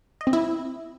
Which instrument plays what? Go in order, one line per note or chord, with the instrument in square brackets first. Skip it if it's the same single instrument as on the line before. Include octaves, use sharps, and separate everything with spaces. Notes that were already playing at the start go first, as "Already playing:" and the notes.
[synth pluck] D#5
C4
E4